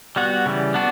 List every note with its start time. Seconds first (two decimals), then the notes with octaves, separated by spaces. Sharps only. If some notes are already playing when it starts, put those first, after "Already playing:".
0.16 G3 B3 F#4
0.46 C#3 E3 G3
0.74 B3 D4 F#4